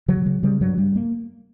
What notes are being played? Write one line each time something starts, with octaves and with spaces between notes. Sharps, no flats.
C#3 F#3
C#3 F#3
C#3 G3
G2 F#3
G2 G3
A#3